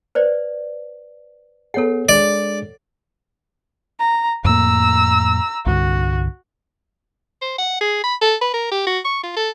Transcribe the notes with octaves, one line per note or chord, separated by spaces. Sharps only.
B4 C5 D5
B3 G#4 A4 C#5 F#5
G#3 D4 G#4 D5
A#5
F2 A2 A#3 A#5 E6
C2 G2 D3 F#4
C5
F#5
G#4
B5
A4
B4
A#4
G4
F#4
C#6
F4
A4